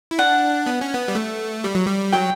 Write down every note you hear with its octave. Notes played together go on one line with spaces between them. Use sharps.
E4
D4 F#5
B3
C#4
B3
G3
A3
G3
F#3
G3
F#3 G5